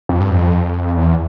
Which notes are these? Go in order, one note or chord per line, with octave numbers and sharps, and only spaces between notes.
F2
G2
F2
E2